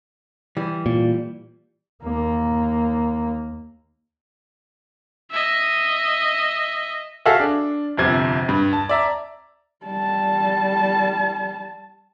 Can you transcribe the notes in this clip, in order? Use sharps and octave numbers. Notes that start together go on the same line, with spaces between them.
E3 G3
A#2
D#2 A#3
D#5 E5
F#4 G#4 A4 E5 F5
D4
G1 F2 C3 G#6
G2
A5
D5 E5 A#5
G3 A5